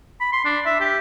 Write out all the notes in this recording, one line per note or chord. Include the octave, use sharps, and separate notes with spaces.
B5
C6
D4
E5
G4